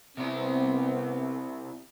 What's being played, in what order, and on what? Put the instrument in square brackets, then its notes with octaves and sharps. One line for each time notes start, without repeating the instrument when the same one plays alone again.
[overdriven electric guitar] C3 E4 [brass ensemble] B3 C4